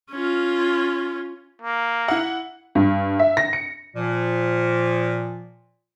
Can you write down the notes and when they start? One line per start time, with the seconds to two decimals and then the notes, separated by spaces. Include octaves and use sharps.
0.11 C#4 F4
1.62 A#3
2.08 E4 F#5
2.75 G2
3.19 E5
3.37 A#6
3.53 C#7
3.95 A#2 F3